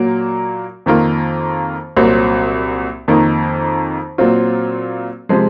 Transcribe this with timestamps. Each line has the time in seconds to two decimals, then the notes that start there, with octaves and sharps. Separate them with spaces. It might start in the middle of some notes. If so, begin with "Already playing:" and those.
Already playing: A#2 F#3 A#3
0.86 F2 D#3 A#3 F4
1.97 C2 A#2 F#3 C4
3.08 F2 D#3 A#3 D#4
4.18 A#2 F#3 C4 F4
5.29 C3 F3 G#3